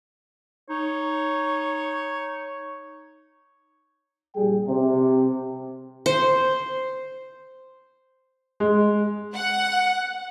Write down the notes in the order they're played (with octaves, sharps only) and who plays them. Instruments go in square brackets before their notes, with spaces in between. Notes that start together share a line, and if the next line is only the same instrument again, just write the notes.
[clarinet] D#4 [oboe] C#5
[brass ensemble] A#1 G3 G#4 G5
C3
[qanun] C5
[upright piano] G#3
[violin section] F#5